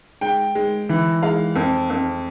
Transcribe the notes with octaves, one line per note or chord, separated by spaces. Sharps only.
G#3 G5
G#3
E3
G#3 F5
F2
F2